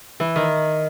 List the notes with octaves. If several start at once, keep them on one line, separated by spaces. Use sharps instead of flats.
E3
D#3